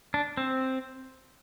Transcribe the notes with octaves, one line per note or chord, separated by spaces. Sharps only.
D4
C4